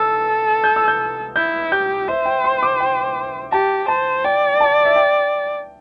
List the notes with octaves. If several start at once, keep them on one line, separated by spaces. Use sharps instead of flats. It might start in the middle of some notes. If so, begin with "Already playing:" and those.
Already playing: A4 E6
G6
E6
G6
E4 G6
G4 G6
C5 E5
G5
C6
D6
G5
G4 A5
C5 A5
D5 G5
A5
E5
G5